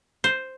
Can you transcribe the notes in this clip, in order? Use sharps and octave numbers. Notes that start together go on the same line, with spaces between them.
C5